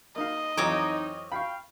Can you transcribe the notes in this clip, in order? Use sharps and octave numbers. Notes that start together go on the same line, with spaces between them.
A#3 D#4 D#5 F5
F2 E3 F#3 C4 D#4 C#5 D6
F5 G5 B5 C#6